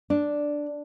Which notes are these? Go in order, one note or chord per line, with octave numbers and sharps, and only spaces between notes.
D4